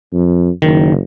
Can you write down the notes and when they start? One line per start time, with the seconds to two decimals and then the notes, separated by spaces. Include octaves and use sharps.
0.13 F2
0.62 F#1 D#3